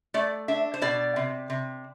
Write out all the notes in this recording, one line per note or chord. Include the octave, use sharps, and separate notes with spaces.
A3 D5
D4 E5
C5
B2 D5
C3
C3